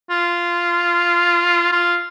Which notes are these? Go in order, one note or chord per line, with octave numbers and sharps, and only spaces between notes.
F4
F4